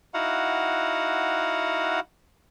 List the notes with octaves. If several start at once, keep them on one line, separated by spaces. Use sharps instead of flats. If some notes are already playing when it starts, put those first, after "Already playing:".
D#4 E4 F#4 F5 F#5